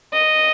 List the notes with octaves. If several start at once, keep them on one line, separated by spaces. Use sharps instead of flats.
D#5